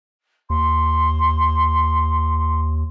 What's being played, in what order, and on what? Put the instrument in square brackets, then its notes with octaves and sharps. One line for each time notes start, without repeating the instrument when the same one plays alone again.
[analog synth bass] D#2 [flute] C6